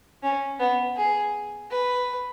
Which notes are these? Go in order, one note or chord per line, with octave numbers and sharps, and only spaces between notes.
C#4
B3
G#4
B4